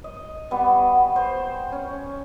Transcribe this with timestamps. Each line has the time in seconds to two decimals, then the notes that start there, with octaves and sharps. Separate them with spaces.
0.04 D#5
0.51 G3 B3 F#4
1.16 C5
1.72 C#4